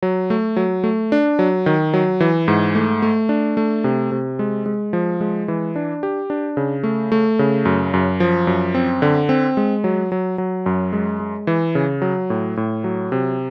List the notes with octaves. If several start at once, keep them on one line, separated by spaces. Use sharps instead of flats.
F#3
A3
F#3
A3
D4
F#3
D#3
F#3
E3
G#2
A3
A3
D4
A3
C3
C3
G#3
G#3
F3
G#3
E3
D4
G4
D4
C#3
A3
A3
C#3
F#2
F#2
F3
F#2
C4
D3
C4
G#3
F#3
F#3
F#3
F#2
G#3
G#3
E3
C#3
F#3
A2
A2
F#3
C3